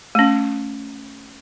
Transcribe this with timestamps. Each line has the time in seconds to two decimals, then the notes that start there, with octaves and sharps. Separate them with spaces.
0.15 A3 C#4